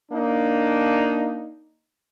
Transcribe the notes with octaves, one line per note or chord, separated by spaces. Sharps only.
A#3 D4 D#4